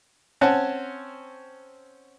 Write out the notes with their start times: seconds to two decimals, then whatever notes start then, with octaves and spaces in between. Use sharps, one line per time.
0.41 C4 C#4 C#5 F#5 A5